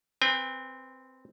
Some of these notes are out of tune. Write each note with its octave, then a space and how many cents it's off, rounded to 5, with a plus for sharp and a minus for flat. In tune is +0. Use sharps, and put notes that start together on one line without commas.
C4 -10 B4 +0 G5 +45